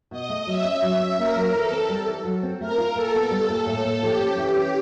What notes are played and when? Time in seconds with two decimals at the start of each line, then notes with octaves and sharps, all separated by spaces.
0.11 B2 D#5
0.29 A3
0.47 F#3 E5
0.64 C#4
0.82 F#3
1.00 C#4
1.18 A#3 A#4
1.36 F#3
1.53 E3 A4
1.71 C4
1.89 G3
2.07 E3
2.25 F#3
2.43 C4
2.60 A3 A#4
2.78 F4
2.95 A#2 A4
3.14 B3
3.31 G3
3.49 A#2
3.66 A2 A4
3.84 A#3
4.02 F3 G4
4.20 C#4
4.38 E3
4.56 C#4